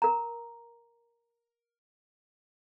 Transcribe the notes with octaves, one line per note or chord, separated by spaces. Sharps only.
A#4 A#5